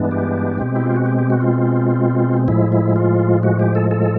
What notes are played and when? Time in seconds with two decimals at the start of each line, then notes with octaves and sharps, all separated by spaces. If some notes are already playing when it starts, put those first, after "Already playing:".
Already playing: G2 E3 G#3 B3 D4
0.11 G4
0.58 B2 G#3 C4
0.76 E4
0.86 F4
0.96 F#4
1.06 G4
1.18 G4
1.30 F#4
1.41 F4
2.48 A2 F3 G#3 E4
2.72 E4
2.96 F4
3.43 F#4
3.59 G4
3.75 A4
3.91 A4